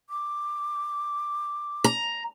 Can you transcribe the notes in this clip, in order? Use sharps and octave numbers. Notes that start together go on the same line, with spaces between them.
D6
A#5